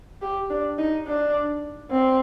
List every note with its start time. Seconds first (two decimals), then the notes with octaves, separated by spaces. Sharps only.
0.21 G4
0.50 D4
0.78 D#4
1.07 D4
1.90 C4